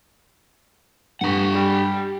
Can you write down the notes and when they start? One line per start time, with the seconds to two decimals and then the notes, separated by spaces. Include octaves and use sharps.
1.21 G2 G4 F#5 C#6
1.52 G3